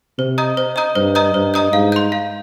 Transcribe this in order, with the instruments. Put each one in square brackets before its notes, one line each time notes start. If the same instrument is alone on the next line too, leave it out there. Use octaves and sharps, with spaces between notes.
[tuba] C3 [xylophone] C5
[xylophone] D#5 A#5 D#6 G6
C5
D#5 A#5 D#6 G6
[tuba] G2 [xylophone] C5
[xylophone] D#5 A#5 D#6 G6
[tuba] G2 [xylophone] C5
[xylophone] D#5 A#5 D#6 G6
[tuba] G#2 [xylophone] F5
[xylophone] C6 G6
F5